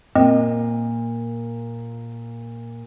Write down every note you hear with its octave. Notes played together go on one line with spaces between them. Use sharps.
A#2 C4 D#5